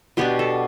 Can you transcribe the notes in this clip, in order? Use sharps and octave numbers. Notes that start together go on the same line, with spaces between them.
B2 B3 D4 G4
A4